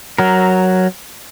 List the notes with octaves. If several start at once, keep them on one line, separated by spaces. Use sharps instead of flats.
F#3 A#4